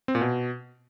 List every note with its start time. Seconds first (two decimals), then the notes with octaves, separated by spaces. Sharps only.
0.08 C4
0.15 A#2
0.21 B2